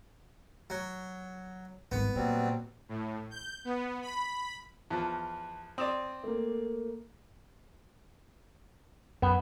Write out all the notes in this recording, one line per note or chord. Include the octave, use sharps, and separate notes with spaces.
F#3
G#1 G3 B3
A#2 F#3 G3 C4
A2
G6
B3
B5
E2 F3 A5 F#6
C4 D5 D#6 E7
A3 A#3
F#2 B3